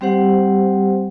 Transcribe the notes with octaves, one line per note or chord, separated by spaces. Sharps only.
G3 C4 G4 C5 F#5